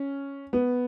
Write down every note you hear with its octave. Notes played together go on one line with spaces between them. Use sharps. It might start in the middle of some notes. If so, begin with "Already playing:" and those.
Already playing: C#4
B3